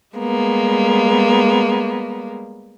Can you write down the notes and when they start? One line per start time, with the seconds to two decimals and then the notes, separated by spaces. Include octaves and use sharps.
0.16 G3 G#3 A#3 B3